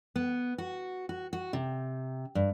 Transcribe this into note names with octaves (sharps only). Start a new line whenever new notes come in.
B3
F#4
F#4
F#4
C3
G2